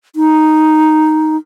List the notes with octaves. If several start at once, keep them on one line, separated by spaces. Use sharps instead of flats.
D#4